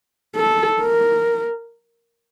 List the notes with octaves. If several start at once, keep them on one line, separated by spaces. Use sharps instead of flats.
A4
A#4